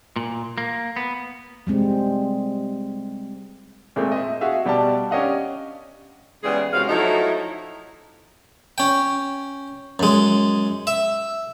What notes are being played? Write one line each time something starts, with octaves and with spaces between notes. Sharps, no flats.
A#2
A#3
B3
G3 G#3 C4
A#2 G#3 A3 C4
D#5 E5
F#4 G#4 E5 F5
B2 G3 G4 D5 A5
C#4 D4 G4 D#5 F5 F#5
C#3 E3 G3 G#3 B3 G#4
F#2 C3 F#3 G#3 F5
F3 F#3 A3 D#4 E4
C#4 G5
F#2 G#3
E5